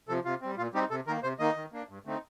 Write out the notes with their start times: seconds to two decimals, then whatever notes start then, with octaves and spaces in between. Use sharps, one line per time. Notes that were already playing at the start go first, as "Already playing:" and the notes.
0.08 C3 F3 A4
0.25 C3 F4
0.41 G3 C4
0.57 A#2 F4
0.74 G3 C4 D#4 G4
0.90 C3 A4
1.07 D#3 A#4
1.10 A#3
1.23 C3 C5
1.39 D#3 A#3 D#4 D#5
1.56 D#3
1.72 A#3 D4
1.89 G2
2.05 D3 A3 C4 D#4